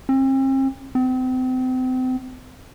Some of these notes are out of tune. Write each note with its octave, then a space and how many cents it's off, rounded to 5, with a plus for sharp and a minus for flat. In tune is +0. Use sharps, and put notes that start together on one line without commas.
C4 +40
C4 -35